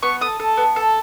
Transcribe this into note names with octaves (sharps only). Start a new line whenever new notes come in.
B3 C#6
A4 D#6
A4
B3
A4